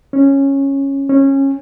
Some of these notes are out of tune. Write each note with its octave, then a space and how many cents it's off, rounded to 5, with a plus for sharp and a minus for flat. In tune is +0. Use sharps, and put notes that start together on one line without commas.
C#4 -10
C#4 -20